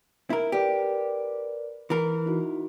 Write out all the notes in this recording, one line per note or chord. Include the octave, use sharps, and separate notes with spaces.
E4 A#4
G4 A#4 B4 D5
E3 A#4
D#4 E4 F#4